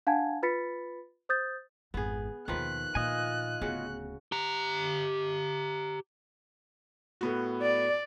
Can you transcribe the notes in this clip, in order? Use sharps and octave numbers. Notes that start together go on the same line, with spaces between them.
D4 F5 F#5 G#5 A5 G#6
F4 B4 B5 A6 B6 C#7
C5 D#6 G6 A6
G#1 F2 B3 G#4
D#2 B2 D#3 F3 B4 F#6
A#2 F4 D#5 G#5
D1 C#3 B3 F#4
G4 A#5
A2 B3 F#4
D5